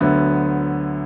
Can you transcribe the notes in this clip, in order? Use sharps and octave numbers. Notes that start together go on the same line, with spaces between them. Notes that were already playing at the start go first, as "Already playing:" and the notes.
D2 D3 F#3 B3